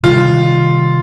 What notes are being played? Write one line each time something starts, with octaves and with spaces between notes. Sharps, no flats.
C3 D#3 G3 F4